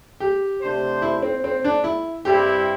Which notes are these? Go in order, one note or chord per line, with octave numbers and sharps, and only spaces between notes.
G4
C3 A3 D4 C5
E4
C4
C4
D4
E4
G2 G3 C4 E4 G4